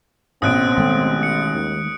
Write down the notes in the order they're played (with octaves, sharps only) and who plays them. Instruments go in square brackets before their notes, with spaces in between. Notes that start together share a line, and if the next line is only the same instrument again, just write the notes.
[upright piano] A1 B2 [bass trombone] C4 [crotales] D#6 F#6 D7
[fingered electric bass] D#3 G#3 A3
[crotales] C#7
[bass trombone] D#2